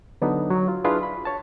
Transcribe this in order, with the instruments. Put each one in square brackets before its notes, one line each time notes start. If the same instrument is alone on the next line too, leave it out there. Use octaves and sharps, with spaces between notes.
[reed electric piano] D3 F#3 B3 D4 D#4
F#3
F4
D4 E4 F4 G#4 B4 F5
B5
C#5 A5